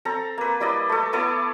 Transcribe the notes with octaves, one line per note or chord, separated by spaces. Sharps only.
C4 A4 A#5
A#3 B4
G3 E4 D5 D#5
A3 A4
B3 E4 A4 D5